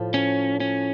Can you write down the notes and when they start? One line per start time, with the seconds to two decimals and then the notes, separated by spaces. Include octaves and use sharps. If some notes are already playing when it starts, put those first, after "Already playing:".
Already playing: A2 F3
0.14 C#4
0.60 C#4